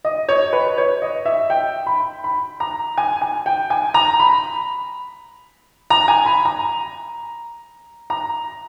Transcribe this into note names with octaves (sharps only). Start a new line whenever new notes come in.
D#5
C#5
B4
C#5
D#5
E5
G5
B5
B5
A#5
G#5
G#5
G5
G#5
A#5
B5
A#5
G#5
B5
A#5
A#5